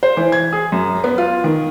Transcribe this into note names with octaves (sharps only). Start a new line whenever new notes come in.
C5
E3
G#6
G#4
F#2
B3
F4
D#3